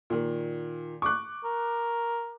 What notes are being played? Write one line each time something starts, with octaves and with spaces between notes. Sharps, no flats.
A#2 D#3
C#6 D6 F#6
A#4